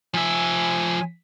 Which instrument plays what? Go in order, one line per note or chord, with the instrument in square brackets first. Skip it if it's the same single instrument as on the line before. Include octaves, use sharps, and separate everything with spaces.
[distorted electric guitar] F3 E5 [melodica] G#5